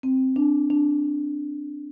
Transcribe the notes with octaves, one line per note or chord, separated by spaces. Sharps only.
C4
D4
D4